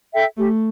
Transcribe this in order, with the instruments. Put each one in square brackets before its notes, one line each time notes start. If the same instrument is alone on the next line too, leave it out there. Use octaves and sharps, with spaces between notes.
[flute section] A4 E5 G5
[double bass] A3 [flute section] G4